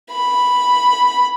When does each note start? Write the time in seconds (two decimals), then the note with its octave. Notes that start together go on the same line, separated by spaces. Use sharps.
0.11 B5